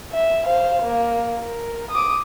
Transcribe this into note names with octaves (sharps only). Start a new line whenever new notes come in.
E5
C5 F5
A#3
A#4
D6 D#6